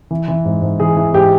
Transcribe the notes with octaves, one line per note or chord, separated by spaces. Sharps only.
E3
E3
G#2
G#2
E3 G#4
E3
G#2 G4